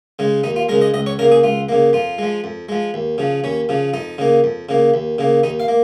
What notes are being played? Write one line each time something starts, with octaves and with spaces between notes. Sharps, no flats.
C#3 G#3
D#2 D#4
F4
C#3 G#3 A#4
D#5
C#2 D#5
C#5
C#3 A#3 A#4
G#4
C#2 F4
C#3 A#3
F2 F4
F3 G#3
F2
F3 G#3
D#2
C#3 F3
D#2 C#4
C#3 F3
F2 D#4
C#3 A#3
F2
C#3 A#3
D#2
C#3 A#3
D#2 D#4
F5
A#3